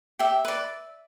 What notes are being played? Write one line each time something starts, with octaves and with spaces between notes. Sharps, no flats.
G4 E5
B4 D5